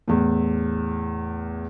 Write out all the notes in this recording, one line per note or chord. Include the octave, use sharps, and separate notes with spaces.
E2 A2